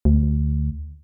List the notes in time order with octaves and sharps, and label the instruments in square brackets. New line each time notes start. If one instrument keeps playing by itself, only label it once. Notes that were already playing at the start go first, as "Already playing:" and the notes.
[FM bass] D2